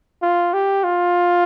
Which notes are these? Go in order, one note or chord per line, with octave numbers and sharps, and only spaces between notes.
F4
G4
F4